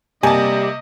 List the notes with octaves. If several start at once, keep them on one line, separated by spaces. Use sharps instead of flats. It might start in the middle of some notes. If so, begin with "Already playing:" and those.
C3 G3 A#3 D#5 G#5 A5